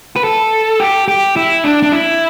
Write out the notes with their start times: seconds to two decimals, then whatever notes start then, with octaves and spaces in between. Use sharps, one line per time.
0.16 B4
0.24 A4
0.80 G4
1.08 G4
1.36 E4
1.64 D4
1.83 D4
1.92 E4